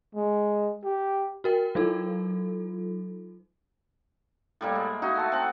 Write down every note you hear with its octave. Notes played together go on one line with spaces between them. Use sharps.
G#3
G4
F#4 A#4 G5
F#3 D#4 F4 A4
A2 G3 A#3
G#3
D#4 E4 F#4
A3 A5 C6
C4 F#5